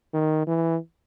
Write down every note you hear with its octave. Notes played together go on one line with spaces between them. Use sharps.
D#3
E3